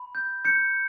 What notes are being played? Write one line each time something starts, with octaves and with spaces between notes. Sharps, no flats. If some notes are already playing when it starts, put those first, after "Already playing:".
Already playing: B5
G6
G6 C#7